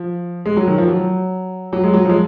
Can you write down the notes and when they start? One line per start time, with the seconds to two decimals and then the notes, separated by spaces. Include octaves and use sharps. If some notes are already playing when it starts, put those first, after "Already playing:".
Already playing: F3
0.46 G#3
0.57 F#3
0.67 D#3
0.78 F3
0.88 F#3
1.73 F#3
1.84 G#3
1.94 F#3
2.05 F3 G#3